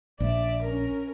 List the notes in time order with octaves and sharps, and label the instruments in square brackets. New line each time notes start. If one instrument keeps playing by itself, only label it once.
[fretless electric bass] A#1 [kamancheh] D5 E5
[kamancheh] C#4 A#4